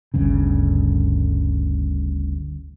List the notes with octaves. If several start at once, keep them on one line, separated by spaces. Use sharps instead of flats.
G1 D2 G2 C#3